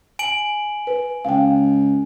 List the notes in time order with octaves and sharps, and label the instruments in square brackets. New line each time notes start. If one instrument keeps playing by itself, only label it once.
[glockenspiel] G#5 D7 F#7
[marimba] B4
[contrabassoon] C#2 [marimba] F5 G5